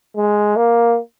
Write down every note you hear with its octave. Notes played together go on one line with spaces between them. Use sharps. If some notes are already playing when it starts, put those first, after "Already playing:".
G#3
A#3